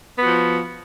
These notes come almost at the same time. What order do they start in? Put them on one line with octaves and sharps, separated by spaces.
B3 F#4 F3